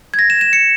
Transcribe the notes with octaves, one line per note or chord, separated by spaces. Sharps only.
G#6
A#6
E7
E7
C#7